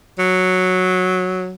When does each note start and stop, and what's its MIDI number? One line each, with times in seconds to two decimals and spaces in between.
0.19 1.53 54